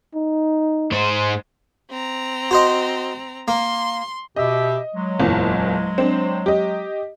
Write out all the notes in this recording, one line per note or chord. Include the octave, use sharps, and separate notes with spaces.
D#4
G#2 C5
C4 A#5
F#4 C5 D#5
A#3 C6
B2 G4 D#5 E5
F#3 G#3
F#1 E2 A#2
C4 D4
G4 D#5